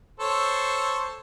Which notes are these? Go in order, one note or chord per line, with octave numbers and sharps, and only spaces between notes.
A4 C5 C#5